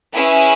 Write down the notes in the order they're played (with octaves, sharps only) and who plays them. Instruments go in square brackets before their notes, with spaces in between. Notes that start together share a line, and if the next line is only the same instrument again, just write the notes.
[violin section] C#4 E4 G#4 B4 E5